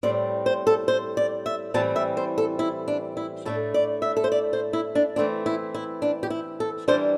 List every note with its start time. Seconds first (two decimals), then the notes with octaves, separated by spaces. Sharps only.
0.03 A2 G3 C4 D5
0.46 C5
0.67 A4
0.88 C5
1.17 D5
1.46 E5
1.74 A2 E3 G3 C4 A5
1.96 E5
2.17 C5
2.38 A4
2.59 E4
2.88 D4
3.17 E4
3.45 A2 A3 D4 A4
3.74 D5
4.02 E5
4.17 A4
4.24 C5
4.32 D5
4.53 C5
4.73 E4
4.95 D4
5.16 E3 A3 C4 D4
5.46 E4
5.74 E4
6.02 D4
6.23 G4
6.30 E4
6.60 A4
6.88 E3 G3 D4 C5